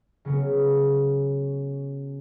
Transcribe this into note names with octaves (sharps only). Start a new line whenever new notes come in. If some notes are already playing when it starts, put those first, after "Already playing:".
C#3 F#3 B3 C#4